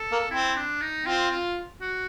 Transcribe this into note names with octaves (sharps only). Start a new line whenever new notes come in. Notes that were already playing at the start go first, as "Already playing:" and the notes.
Already playing: A4
A#3
C4 E4
D4
D#4
C4 F4
F4
F#4